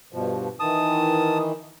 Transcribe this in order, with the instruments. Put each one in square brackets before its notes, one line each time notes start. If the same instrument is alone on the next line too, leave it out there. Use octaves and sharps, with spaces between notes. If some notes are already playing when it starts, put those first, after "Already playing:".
[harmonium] G2 B2 F3
[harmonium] D#3 E3 [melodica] A5 D#6